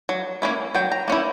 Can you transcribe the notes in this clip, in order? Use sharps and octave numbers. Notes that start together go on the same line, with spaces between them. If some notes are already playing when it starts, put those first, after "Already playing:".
F#3
A#3 C#4 E4
F#3 G5
A#5
A#3 C#4 E4